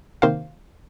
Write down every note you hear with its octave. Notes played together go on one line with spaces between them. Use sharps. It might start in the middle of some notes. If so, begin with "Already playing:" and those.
C3 D#3 A#3 C5 F5